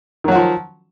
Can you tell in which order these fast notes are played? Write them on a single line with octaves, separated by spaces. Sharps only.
D#3 F#3 F#4 F3